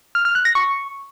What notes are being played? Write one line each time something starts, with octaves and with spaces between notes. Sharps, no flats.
F6
F6
F#6
A#6
C#6